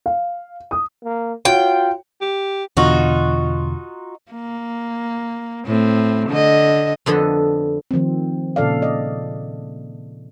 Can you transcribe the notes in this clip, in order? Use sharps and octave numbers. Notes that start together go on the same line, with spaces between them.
F5
D#6
A#3
F4 F#4 C#5 F#5 G5
G4
E2 B2 D3 D#4 F4 F#4
A#3
A2 C4
D3 D#5
F2 D3 B3 A4 D#5
D#3 F3 A3 C4
A#2 C#3 A4 D5 F5
D5 D#5